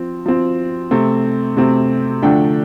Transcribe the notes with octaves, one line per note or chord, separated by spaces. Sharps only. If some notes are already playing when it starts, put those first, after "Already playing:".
Already playing: F3 C4
F3 C4
C3 A3 C4
C3 A3 C4
D3 F3 A3 D4 G5